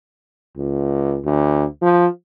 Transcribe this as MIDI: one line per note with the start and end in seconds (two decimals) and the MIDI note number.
0.57 1.19 37
1.25 1.65 38
1.82 2.07 53